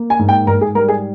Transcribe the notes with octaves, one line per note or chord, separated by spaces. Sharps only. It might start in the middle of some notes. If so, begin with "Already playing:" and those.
Already playing: A#3
G#5
G#2
G5
G#2 A#4
G#4
G3 A#4
G#4